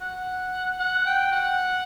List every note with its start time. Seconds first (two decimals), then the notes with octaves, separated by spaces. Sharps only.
0.01 F#5
0.79 F#5
1.06 G5
1.32 F#5